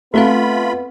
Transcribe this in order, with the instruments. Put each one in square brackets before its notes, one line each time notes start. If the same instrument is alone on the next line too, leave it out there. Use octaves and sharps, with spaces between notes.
[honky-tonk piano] A3 [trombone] B3 [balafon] C4 A4 F5 [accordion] F4 B5